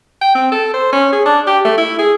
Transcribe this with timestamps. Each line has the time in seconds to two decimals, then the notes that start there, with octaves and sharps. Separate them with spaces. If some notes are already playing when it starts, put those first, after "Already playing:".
0.21 G5
0.35 C4
0.52 A4
0.74 C5
0.93 C#4
1.13 G#4
1.26 D4
1.47 G4
1.65 A3
1.78 E4
1.99 G#4